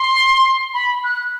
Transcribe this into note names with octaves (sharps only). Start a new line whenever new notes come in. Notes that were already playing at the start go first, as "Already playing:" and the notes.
Already playing: C6
B5
F#6